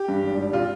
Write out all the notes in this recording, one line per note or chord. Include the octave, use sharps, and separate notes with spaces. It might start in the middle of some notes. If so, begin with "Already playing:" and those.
Already playing: G4
G2
G#1
G3
C3 F4